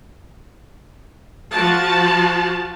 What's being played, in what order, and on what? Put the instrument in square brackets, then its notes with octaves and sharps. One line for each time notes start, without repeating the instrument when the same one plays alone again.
[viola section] F3 F#4 A5